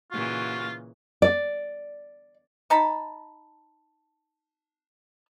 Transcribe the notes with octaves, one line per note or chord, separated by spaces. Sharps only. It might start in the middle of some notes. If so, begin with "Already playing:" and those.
A#2 C#3 E3 F4 F#4
D5
D#4 A5 B5